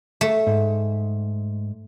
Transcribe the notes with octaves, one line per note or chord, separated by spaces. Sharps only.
A3
G#2